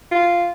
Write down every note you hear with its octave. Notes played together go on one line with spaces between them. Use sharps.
F4